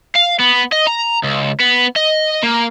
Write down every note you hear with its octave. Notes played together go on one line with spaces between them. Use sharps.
F5
B3
D#5
A#5
C#2
B3
D#5
A#3